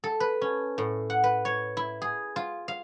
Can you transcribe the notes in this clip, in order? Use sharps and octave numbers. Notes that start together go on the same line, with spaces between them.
A4
B4
C#4
A2
F#5
B4
C#5
E4
G#4
F4
F5